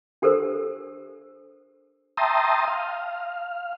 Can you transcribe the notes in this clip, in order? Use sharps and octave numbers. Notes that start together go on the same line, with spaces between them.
D4 G4 A4 A#4 C5
E5 G5 A5 A#5 C6 D#6
F5